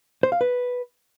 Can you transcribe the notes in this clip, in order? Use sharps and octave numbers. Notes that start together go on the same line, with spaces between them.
C5
F5
B4